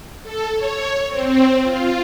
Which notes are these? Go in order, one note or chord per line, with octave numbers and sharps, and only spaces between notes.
A4
C#5
C4
F4